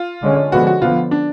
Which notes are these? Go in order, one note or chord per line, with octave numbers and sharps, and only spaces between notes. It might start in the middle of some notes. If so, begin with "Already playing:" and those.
Already playing: F4
D3 G#3 C#4
D3 F3 G#3 B3 F#4
F#4
D3 F3 B3 F4
D4